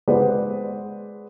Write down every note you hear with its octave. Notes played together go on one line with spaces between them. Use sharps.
G#3 B4 C5 D5 F#5